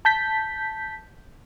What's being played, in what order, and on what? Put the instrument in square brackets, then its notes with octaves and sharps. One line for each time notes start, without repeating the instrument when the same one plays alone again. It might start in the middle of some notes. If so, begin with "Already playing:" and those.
[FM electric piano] A5 G6 B6